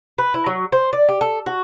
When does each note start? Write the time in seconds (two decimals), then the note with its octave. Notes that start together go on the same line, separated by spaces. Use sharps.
0.18 B4
0.34 E4
0.46 F#3
0.72 C5
0.93 D5
1.08 G4
1.21 A4
1.46 F#4